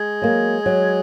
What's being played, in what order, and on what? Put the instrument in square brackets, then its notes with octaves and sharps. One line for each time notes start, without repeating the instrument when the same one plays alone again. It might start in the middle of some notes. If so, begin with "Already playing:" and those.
Already playing: [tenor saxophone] G#3
[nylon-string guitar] F#3 A#3
F#3